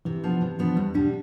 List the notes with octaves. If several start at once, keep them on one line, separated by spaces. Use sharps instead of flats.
C3 E3
F3 B3 D4
C3
F3 B3 D4
E2 G3
B2 G3 D4